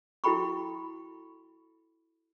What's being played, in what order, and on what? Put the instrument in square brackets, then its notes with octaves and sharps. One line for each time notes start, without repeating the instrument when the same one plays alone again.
[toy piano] E4 F#4 A4 G5 B5 C#6